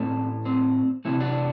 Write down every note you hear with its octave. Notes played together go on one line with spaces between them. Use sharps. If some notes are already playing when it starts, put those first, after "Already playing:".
Already playing: A2 E3 A3 C4
C4
C3 E3 A3 C4 E4
D4 F#4